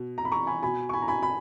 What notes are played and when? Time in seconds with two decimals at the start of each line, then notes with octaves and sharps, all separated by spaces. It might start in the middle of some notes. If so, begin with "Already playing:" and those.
Already playing: B2
0.18 A#5
0.25 B5
0.32 A#5 C#6
0.47 G#5 B5
0.62 B2 G#5 B5
0.89 C#6
0.93 G#5 B5
1.02 A#5
1.08 G#5 B5
1.23 B5